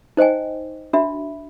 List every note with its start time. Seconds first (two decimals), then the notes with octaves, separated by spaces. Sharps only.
0.17 D#4 C5 D#5 G5 G#5
0.93 D4 F#4 E5 B5